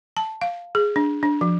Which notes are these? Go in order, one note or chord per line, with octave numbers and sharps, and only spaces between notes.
A5
F5
G#4
D4
D4
F3